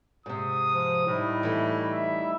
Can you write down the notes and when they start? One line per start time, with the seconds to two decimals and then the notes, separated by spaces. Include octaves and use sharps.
0.26 G#2 C3 D#6
0.74 F3
1.06 A2 G3 D#4 E4
1.43 E3 A3
1.90 E5